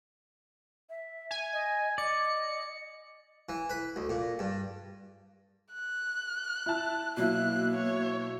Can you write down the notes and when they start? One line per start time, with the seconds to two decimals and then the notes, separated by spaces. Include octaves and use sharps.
0.89 E5
1.31 G#5
1.53 D#5
1.98 D5 D#5 C#7
3.49 E3
3.70 B4
3.96 D2
4.10 A#2
4.39 G2
5.73 F#6
6.66 E4 A5
7.17 B2 F#3 A#3 E4 F#6
7.74 C#5